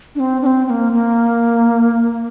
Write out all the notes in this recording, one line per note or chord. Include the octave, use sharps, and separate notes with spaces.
D4
C4
D4
C4
C4
A#3
A#3